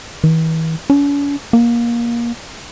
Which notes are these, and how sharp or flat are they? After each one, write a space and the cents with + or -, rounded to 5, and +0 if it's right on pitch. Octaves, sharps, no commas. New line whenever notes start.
E3 -40
C#4 +45
A#3 +20